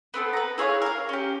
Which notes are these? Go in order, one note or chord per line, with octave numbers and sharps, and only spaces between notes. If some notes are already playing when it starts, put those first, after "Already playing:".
B3 C4 A4 B4
B4 A#5
E4 G#4 C#5 F5
A#4 F5
C#4 G4